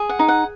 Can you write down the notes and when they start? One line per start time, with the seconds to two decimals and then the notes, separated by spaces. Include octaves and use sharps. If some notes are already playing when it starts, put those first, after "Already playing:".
Already playing: G#4
0.09 F#5
0.19 D#4
0.28 F#5